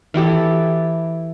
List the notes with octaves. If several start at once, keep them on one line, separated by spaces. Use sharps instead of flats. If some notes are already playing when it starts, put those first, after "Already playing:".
E3 E4 G4 A4